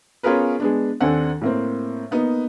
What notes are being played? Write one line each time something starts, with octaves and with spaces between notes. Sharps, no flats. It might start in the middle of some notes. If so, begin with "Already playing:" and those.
B3 C#4 F4 G#4 A#4 B4
G#3 B3 D4
D#2 C4 D4 A4 F#5 G#5
A2 A#3 C4
A#3 B3 D#4